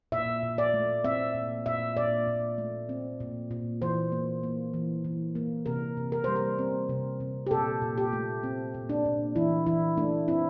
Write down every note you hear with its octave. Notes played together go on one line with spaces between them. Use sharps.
A#2 E5
A#2
D5
A3
C4 E5
A#2
A#2 E5
A#2 D5
A#2
A3
C4
A#2
A#2
E3 C5
A#3
A#3
E3
E3
A#3
C3 A#4
C3
A#4
G3 C5
A#4
C4
C3
C3
G4
A#2 A4
A#2
G4
A3
C4
A#2
D4
A#2
E3 E4
E3 E4
A3 D4
C4 E4